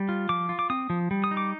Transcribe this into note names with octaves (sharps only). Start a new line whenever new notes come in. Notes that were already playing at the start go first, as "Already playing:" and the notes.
Already playing: G3
F4
F3 D6
F4
D6
C4 D#6
F3
G3
D#6
D#4
D6